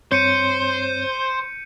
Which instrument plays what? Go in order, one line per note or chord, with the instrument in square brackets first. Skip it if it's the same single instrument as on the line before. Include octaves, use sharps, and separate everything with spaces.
[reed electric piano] G2 C4 C#5 [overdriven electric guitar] C5 [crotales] G6 C#7 D#7